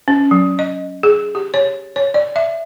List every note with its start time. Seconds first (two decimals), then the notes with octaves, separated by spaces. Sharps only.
0.08 C#4
0.31 F#3
0.59 D#5
1.03 G#4
1.35 G4
1.54 C#5
1.96 C#5
2.14 D5
2.36 E5